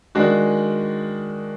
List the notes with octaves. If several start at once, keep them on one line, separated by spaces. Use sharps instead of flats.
D#3 G#3 D4 F#4